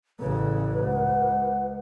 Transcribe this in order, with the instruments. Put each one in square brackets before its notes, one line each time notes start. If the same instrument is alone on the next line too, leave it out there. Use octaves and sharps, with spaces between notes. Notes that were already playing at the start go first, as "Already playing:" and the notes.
[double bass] A1 C#3 [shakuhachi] B4
[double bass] C#2 [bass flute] F#5